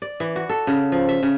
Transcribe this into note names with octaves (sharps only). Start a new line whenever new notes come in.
D5
E3
F#4
A4
C#3
F3
E5
C#3